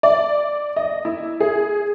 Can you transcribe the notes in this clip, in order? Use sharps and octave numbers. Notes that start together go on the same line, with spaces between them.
D5
D#5
E4
G#4